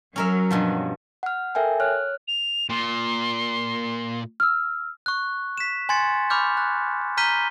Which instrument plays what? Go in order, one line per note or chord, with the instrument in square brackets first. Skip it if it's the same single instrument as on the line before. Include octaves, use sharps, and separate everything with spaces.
[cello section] F#3 [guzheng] C#4 A#4 E5
[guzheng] G2 B2 F3
[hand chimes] F#5 F6
A4 A#4 E5 G5 G#5
C#5 F6 F#6
[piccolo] F7
[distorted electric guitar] A#2 [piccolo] C6
[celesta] E6 F6
[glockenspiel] C#6 F#6
B6 E7
G#5 C6 G#6 A6 C#7
B5 C#6 D6 F6 G6
F#6
A#5 F6 G6 B6 D#7 G7